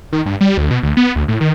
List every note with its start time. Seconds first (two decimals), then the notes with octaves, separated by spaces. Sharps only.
0.13 D#3
0.26 G2
0.41 G3
0.57 D2
0.71 B2
0.83 D2
0.97 B3
1.16 D2
1.28 A2
1.41 D#3